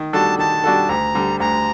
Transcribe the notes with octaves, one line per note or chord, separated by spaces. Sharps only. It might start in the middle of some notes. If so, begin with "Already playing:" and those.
Already playing: D#3
G3 D4 F#4 A4 A5
D#3 A5
G3 D4 F#4 A4
D2 A#5
D3 G3
D2 A#5